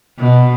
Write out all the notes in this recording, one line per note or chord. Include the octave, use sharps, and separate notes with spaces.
B2